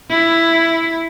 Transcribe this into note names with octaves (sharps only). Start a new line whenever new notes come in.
E4